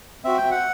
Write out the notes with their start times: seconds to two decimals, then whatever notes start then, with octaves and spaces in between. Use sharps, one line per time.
0.24 C4 F#4 E5
0.37 G5
0.51 F#5